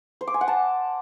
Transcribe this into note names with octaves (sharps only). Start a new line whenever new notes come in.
C5
D6
G#5
F#5
A5